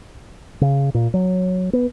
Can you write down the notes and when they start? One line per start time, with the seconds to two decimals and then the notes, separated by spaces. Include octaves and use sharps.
0.61 C#3
0.94 A#2
1.14 F#3
1.73 B3